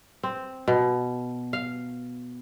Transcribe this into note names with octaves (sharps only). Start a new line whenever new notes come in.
C4
B2
F5